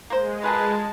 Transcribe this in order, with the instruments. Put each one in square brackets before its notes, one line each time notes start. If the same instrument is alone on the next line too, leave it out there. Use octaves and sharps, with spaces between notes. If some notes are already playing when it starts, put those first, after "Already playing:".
[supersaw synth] G#3 [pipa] A#3 C5
[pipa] F4 G#4 A#4 [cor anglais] B4 [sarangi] A5